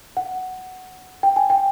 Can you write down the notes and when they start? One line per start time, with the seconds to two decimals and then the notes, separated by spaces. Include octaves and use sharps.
0.17 F#5
1.23 G5
1.36 G#5
1.50 G5